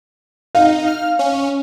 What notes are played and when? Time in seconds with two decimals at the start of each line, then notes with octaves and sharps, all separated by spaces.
0.55 D#4 F5
0.87 F6
1.19 C#4